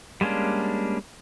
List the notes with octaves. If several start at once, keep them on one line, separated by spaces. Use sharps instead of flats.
G3 G#3 A#3 C#4 D4